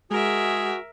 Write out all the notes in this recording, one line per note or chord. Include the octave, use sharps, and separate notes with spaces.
G#3 F#4 G#4 A#4 E5